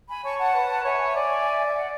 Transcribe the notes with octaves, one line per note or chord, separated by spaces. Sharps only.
G#5 B5
C#5 A5 C#6
F#5 A5
B4
C#5 E5 G#5
E5 G#5
D5
E5
D5 F#5